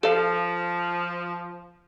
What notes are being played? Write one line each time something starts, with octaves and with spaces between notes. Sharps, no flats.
F3 A4 F5